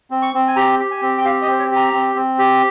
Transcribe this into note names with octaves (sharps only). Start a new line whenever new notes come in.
C4
C#6
C4
G#5
G4 A#5
G4
G#5
C4
G5
G4 F5
D#5
C4 C5
C#5
G4
A#5
C4
C4
G4